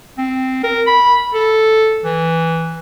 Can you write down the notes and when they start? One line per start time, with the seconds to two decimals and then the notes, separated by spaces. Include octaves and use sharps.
0.18 C4
0.64 A#4
0.87 B5
1.34 A4
2.04 E3